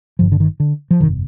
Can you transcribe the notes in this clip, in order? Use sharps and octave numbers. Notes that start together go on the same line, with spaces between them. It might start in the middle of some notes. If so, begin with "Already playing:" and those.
G1 G2 D3 F3
D3
D#3
D3
F3
G1 F2 C3 D#3